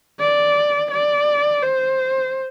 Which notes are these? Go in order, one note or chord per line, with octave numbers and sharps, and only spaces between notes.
D5
D5
C5